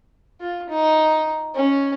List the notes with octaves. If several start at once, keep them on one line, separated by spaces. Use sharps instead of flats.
F4
D#4
C#4